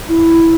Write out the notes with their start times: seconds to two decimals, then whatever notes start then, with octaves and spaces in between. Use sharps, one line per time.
0.09 E4